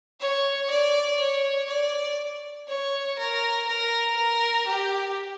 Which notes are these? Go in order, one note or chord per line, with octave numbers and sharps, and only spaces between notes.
C#5
D5
C#5
D5
C#5
A#4
A#4
A#4
G4